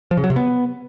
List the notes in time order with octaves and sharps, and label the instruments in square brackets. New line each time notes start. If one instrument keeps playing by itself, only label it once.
[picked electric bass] F3
C#3
F#3
C3
B3